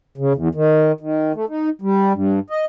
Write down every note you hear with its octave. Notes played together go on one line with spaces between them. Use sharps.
C#3
E2
D#3
D#3
A3
D#4
G3
G2
D#5